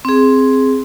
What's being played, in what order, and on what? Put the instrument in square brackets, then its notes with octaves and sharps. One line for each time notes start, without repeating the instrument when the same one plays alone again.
[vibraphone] C4 G#4